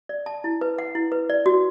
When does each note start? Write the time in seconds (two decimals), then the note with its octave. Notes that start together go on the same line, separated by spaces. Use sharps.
0.09 D5
0.26 A5
0.44 E4
0.61 B4
0.78 F#5
0.95 E4
1.12 B4
1.30 D5
1.46 F#4